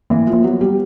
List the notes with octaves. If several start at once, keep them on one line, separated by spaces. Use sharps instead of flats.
E3 A#3
F3
A#3
F#3 B3
G3